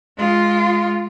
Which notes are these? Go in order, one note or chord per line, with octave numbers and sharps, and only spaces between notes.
G#3 F4